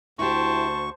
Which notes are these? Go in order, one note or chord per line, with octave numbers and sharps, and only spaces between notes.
D2 E4 G4 C5 A5 C#6